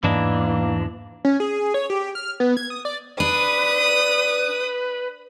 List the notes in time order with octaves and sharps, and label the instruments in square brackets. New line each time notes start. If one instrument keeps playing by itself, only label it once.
[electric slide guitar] E2 D4 D#5 [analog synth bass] G#2 [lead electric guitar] E3 [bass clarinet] A#3
[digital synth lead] C#4
G#4
C#5
G4
F6
B3
G#6
D#6
D5
[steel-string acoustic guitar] D4 [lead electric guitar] B4 [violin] D#6